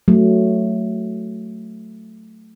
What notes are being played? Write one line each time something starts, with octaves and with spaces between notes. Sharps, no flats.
F#3 A3